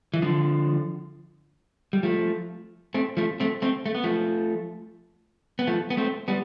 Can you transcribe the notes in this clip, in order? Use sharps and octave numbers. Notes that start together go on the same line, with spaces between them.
E3
D3 F3
G3
F3 A3
A3 C4
F3 A3
A3 C4
A3 C4
A3
B3
F3 A3
B3
F3 A3
B3
A3 C4
G3 B3